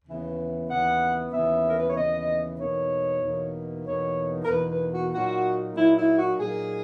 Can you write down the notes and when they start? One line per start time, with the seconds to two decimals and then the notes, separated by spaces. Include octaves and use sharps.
0.05 D#2 C#3 E3 B3
0.68 D#2 C#3 E3 B3 F#5
1.32 D#2 C#3 E3 B3 E5
1.69 A#4
1.77 B4
1.86 C#5
1.95 D#2 C#3 E3 B3 D#5
2.58 E2 B2 A#3 D#4 C#5
3.22 E2 B2 A#3 D#4
3.85 E2 B2 A#3 D#4 C#5
4.44 A#4
4.49 E2 B2 A#3 D#4 B4
4.70 B4
4.91 F#4
5.12 A#2 F#3 A#3 D#4 F#4
5.75 A#2 F#3 A#3 D#4 E4
5.97 E4
6.18 F#4
6.39 A#2 F#3 A#3 D#4 G#4